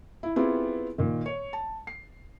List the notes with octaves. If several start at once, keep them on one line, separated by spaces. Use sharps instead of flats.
E4
B3 C4 E4 F4 G4 G#4
A#2 D#3
C#5
A5
C7